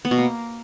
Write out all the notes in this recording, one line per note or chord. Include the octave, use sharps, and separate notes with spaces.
B3
B2
A#3